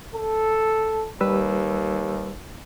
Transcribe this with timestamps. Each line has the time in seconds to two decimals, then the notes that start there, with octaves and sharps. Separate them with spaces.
0.15 A4
1.21 D#2 G3 B4 E6